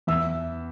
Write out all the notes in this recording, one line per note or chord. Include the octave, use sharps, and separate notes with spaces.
E2 E5 E6